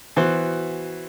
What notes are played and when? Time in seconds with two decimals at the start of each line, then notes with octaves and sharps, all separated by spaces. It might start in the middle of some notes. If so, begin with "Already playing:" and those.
0.16 E3 B3 F#4 C5